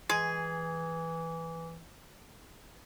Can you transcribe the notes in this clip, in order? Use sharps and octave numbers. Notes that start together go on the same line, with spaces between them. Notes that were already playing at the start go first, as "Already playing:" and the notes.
E3 G#3 G#4